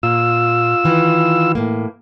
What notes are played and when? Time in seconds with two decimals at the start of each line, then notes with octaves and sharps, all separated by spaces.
0.03 A#2 F4 E6
0.84 D#3 E3
1.55 A2 A#3